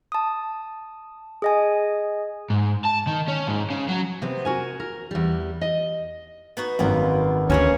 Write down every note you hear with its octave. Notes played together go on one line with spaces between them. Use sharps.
A5 D#6
G#4 D#5 G#5
G#2
A5
D#3
C#4
G#2
C#3
F#3
C3 B3 C4
F#4 A#4 G#5
A#4
E2 G3
D#5
B3 D#4 F#4
G#1 F#2 A#3 B3 F4
D2 E3 A#3 C#4 G#4